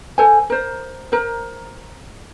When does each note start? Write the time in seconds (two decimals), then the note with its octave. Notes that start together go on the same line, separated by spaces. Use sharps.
0.18 A4 C5 G#5
0.50 A#4 C5
1.12 A#4 C5